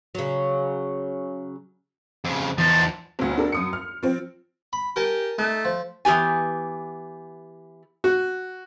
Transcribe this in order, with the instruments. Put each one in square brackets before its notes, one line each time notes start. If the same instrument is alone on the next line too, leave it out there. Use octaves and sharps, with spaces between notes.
[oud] C#3 F#3
[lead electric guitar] F2 C#3
[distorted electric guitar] E2 [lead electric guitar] F3 D#4 [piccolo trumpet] A5
[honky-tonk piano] G1 D2
D4 A4 A#4
F#2 D#6 C#7
F6
F3 C4
[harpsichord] B5
[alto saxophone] G4 [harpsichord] A#4 G#5 A5
[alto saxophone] A3 [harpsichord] D#4
[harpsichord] F3
[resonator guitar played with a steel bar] E3 B3 G4 G#5
[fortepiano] F#4